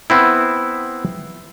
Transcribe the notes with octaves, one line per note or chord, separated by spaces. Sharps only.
B3 C4 E4